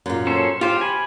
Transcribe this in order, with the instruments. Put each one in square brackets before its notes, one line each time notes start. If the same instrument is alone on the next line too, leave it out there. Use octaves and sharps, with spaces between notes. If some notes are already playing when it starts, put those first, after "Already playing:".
[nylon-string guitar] F#2 A#2
[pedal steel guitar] C#4 A4 C5
[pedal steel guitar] F4 C5 [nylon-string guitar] G4
[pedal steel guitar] G#5 B5